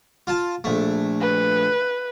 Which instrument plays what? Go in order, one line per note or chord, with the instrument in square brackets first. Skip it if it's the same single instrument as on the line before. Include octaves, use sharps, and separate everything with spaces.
[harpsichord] F4 A5
A#1 A3
[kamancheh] B4